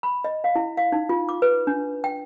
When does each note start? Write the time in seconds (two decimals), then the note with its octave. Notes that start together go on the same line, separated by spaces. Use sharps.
0.03 B5
0.24 D#5
0.44 F5
0.55 E4
0.77 F5
0.92 D#4
1.09 F4
1.29 D6
1.42 B4
1.67 D4
2.04 G5